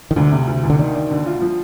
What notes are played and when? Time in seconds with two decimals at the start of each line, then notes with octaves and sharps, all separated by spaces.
0.11 D#3
0.16 D2 D3
0.32 C3
0.47 D2
0.63 D2
0.70 D3
0.78 D#3 D4
0.95 D4
1.11 D3
1.26 F4
1.42 F3